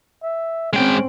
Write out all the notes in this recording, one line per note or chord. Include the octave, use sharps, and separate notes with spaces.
E5
G#3 C4 C#4 G5